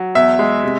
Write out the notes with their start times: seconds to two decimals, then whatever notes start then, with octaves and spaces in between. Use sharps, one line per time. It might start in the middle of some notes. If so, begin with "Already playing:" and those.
Already playing: F#3
0.15 E2 E5
0.39 G#3
0.64 C3